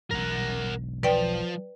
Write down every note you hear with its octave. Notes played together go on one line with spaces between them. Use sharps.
E1 B1 E2 A#4 F#5
F3 B4 D5 G5